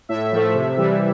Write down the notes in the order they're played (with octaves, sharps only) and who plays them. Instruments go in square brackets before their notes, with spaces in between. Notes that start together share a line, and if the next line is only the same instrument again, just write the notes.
[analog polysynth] A2 E5
F3 A3
C3
E3 G3